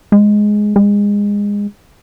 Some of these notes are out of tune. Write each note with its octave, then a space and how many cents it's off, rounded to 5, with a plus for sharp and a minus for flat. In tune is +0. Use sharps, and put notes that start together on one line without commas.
G#3 +5
G#3 -25